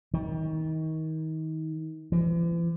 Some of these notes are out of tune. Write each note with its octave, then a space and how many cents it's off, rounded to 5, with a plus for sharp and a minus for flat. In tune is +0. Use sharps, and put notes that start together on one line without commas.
D#3 +30
E3 +45